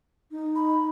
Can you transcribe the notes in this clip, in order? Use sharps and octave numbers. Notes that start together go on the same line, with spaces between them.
D#4
B5